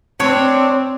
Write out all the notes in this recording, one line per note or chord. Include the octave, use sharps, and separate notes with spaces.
C4 D4 C#5